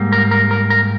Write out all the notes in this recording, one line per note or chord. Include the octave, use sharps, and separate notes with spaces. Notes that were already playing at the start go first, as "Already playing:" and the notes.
Already playing: G#2 G3 A#3
A#4
A#4
A#4
A#4